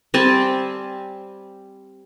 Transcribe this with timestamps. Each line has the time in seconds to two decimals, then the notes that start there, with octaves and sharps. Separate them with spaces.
0.14 G3 C4 G#5 A5